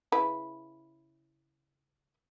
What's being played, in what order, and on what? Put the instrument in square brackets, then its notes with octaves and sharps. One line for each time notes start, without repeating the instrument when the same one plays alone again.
[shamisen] C#3 E4 B4